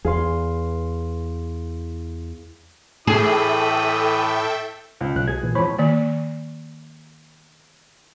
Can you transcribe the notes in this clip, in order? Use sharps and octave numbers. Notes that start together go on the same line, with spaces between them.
E2 G#4 F5 C6
A2 E3 G#4 A4 E5 G5 D#6
C#2
B1 F#6
G#4 G#6
A#2 E3
F2 E3 C5 C#5 B5
D#3 A#3